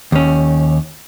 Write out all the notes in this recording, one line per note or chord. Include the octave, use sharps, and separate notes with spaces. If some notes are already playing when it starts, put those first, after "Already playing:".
D#2 C#4